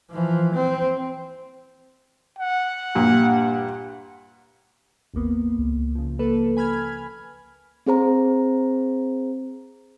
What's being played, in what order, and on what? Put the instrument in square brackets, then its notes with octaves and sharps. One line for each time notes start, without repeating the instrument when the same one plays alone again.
[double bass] E3 F3
C4
[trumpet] F#5
[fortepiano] G2 A#2
[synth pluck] G#1 D#2 A#3 B3
C#2
C#3 F3
A#3 A4 B4
G#5 B5 F6 G#6
[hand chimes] C4 G#4 C5 A#5